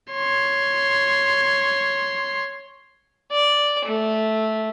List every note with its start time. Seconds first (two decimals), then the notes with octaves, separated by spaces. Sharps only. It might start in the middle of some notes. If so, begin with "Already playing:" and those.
0.12 C#5 C6
3.32 D5
3.85 A3